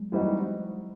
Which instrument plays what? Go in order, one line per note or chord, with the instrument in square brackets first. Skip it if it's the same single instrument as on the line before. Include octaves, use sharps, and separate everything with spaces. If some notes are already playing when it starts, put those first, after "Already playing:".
Already playing: [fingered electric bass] F#3 G#3
[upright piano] E3 G3 C4 D#4 F#4